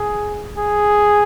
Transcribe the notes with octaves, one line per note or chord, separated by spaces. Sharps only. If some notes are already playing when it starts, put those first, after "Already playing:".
Already playing: G#4
G#4